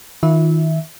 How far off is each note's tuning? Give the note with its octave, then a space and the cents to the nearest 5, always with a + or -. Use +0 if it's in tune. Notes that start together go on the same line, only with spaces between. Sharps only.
D#3 +25 F4 +0 E5 -15